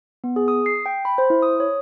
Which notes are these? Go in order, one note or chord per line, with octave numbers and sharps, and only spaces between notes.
B3
G#4
D#6
C7
G5
B5
C5
E4
D#6
C#5